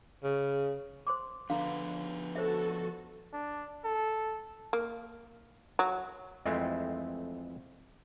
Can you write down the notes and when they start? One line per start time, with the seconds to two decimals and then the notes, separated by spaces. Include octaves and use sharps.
0.24 C#3
1.07 C5 C6 D6
1.50 D3 F3 B3 B4 F5 A#5
2.35 F#4 A4 C5 E5
3.33 D4
3.85 A4
4.73 A#3
5.79 F#3
6.46 F2 E3 G#3 A3 C4